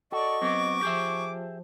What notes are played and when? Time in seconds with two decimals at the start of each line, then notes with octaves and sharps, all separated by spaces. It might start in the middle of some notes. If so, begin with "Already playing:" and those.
0.12 F#4 A4 D5 D#5 C#6
0.42 F#3 B3 C4 D6
0.83 F3 G4 G#4 E5